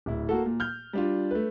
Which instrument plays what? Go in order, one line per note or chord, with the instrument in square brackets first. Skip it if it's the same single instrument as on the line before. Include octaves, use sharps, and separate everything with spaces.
[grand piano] D1 E4
A#3 F#4 A4
A#2
F6 G6
G3 D4 F4
A3 B4